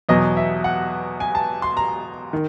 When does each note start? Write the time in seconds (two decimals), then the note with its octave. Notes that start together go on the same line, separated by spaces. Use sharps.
0.09 E2 B2 F#3 D#5
0.37 E5
0.64 F#5
1.20 G#5
1.35 A5
1.62 C6
1.77 A#5
2.33 D#3